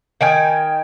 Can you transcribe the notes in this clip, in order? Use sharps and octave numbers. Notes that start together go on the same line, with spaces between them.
D#3 G5 G#5